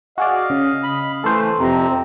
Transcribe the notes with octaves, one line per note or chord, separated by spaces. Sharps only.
F#4 G#4 D5 D#5 F5
C#3
B5
E3 A3 A4 C5
F2 C3 C4 A#5